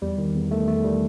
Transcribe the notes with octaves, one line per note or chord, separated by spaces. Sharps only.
E2 G3
D#3
E2
D#3 A3
E2 A3
D#3 G3